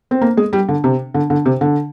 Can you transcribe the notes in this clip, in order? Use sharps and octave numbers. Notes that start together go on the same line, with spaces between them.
C4
A#3
G#3
G3
D3
C3
D3
D3
C3
D3